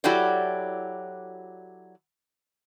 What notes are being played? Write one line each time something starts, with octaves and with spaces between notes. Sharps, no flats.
F#3 E4 F#4 G4 A4 D5